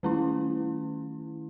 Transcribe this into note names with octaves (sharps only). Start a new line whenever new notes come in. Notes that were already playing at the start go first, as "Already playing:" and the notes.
D#3 A3 C#4 E4